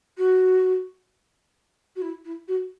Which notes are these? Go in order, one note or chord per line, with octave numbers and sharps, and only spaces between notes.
F#4
F#4
E4
E4
F#4